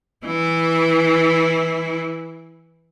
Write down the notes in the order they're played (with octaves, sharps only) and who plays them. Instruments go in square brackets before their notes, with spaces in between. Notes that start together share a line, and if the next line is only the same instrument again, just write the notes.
[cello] E3 E4